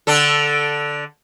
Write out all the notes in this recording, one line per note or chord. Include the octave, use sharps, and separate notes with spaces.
D3 D4 A4